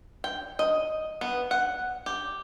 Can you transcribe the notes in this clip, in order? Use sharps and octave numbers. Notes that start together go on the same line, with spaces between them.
G5
D#5
B3
F#5
G4